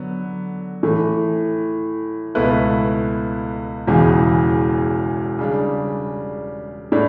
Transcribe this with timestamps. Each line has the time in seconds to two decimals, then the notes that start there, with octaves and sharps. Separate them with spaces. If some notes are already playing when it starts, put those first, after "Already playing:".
Already playing: D3 F#3 B3
0.83 A2 E3 A3
2.35 C#2 B2 A3 E4 B4
3.87 E1 E2 C#3 E3 B3
5.39 C#3 G3 D4
6.92 A2 G3 D4